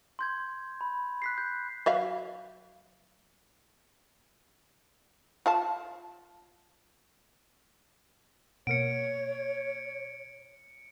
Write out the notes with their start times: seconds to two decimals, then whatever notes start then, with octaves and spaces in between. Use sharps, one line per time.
0.19 C6 G6 G#6
0.81 B5
1.22 F#6 B6 C7
1.38 G6
1.86 F#3 E5 F5
5.46 F4 F5 A5
8.67 B2 A#3 C#5 C#7 D7